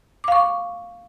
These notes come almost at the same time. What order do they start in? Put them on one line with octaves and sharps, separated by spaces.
D6 F5 C#6